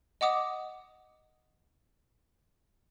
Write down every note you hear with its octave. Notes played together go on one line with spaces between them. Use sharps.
D#5 F#5 D6 D#6